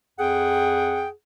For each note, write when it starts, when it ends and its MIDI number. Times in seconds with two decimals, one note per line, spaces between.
0.18 1.08 41
0.18 1.08 68
0.18 1.08 78
0.18 1.08 79